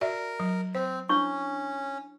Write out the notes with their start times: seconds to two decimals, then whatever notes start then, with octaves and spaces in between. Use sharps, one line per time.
0.01 F#4 A#4 D5 E5
0.40 F#3
0.75 C4 C5
1.09 C#4 D4 E4 C#6